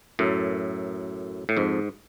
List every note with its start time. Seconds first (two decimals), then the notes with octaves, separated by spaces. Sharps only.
0.19 F#2 A2
1.49 A2
1.57 F2 G#2